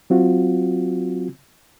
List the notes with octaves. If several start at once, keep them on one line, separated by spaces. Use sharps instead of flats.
F#3 C4 F4 F#4